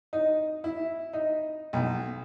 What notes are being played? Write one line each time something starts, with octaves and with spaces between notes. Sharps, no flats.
D#4
E4
D#4
B1